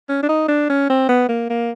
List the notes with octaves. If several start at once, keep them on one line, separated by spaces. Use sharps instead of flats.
C#4
D4
D#4
D4
C#4
C4
B3
A#3
A#3